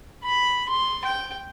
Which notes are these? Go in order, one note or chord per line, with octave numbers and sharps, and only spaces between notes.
B5
C6
G5